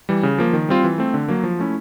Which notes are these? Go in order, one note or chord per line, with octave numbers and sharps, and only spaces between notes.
E3 G3
C#3
F3 A#3
D#3
G3 C4 F4
E3
A3 C4
D3
F#3 A#3
F3
A3 C#4 E4